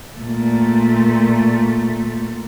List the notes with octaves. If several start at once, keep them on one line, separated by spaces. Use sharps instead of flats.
A#2 A3